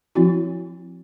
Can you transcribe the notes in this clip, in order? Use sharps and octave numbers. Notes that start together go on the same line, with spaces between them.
F3 C4 E4 F#4